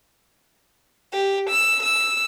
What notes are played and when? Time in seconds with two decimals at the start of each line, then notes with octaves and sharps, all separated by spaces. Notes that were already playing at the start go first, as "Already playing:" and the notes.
1.13 G4
1.50 E6
1.83 E6